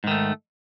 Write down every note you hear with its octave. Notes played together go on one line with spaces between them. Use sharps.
G#2 D#3 A3